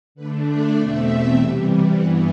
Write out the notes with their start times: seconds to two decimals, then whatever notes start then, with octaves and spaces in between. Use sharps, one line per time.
0.15 D3 A3 D4 B4
0.45 D5
0.75 E2 B2 A3 C4 E5
1.36 C3 E3 G3
1.95 G2 E3 B3 F#5